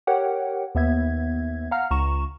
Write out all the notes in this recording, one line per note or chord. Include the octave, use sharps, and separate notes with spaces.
G4 A#4 C#5 F#5 G5
D#2 B3 E5 G#6
F5 F#5 A#5 F6
C#2 A#5 C#6 E7